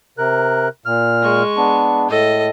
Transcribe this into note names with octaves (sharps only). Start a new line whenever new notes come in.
C3 A#4 F#6
A#2 F6
G#3 C#6
B3 D4
A2 A4 D#5